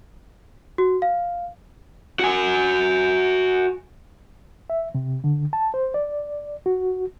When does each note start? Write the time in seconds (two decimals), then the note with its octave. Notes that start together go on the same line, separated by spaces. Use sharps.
0.78 F#4
1.02 F5
2.19 F#4 G#5
4.70 E5
4.95 C3
5.24 D3
5.53 A5
5.74 C5
5.94 D5
6.66 F#4